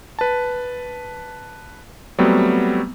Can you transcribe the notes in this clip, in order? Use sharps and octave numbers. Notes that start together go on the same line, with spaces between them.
B4 A5
F#3 G3 A3 B3 C4